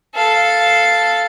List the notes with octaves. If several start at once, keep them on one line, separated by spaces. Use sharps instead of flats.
A4 F5